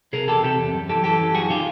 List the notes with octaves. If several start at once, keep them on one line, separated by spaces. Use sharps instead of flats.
C3 G#4 A#4
E2 G4 A4
C3 G4 A4
E2
F#2
E3 G4 A4
E3 G4 A4
F#2
F#2 F#4 G#4
D#3 F4 G4